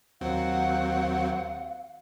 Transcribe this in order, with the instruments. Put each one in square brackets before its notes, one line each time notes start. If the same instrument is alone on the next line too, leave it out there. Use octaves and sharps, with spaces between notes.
[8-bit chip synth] D#2 F#3 C4 [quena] F5 [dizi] F#5